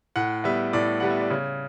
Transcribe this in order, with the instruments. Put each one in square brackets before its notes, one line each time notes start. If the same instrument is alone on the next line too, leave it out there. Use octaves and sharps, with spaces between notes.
[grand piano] A2 F#5
G3 B3 E5
A2 D5
G3 B3 F#5
E5
D5
C#3 C#5